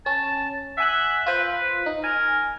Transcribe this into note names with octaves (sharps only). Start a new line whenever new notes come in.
C#4 A5
E5 F#5 G#5 F#6
F4 B4 C5
B4
D#4
A#4 G#5